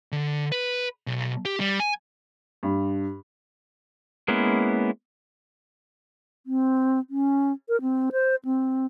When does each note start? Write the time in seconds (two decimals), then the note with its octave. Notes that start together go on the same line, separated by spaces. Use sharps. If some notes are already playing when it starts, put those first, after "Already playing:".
0.12 D3
0.52 B4
1.07 B1
1.45 G4
1.60 G3
1.80 G#5
2.63 G2
4.28 G#3 A#3 B3 C#4 E4
6.46 C4
7.10 C#4
7.69 A#4
7.82 C4
8.12 C5
8.45 C4